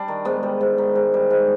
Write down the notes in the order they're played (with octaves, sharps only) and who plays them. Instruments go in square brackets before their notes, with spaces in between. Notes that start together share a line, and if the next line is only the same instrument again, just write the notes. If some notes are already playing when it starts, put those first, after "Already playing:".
Already playing: [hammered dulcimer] G3 D4
D#3
G#2 B3
G3
G#2
D#3
G#2
G3
G#2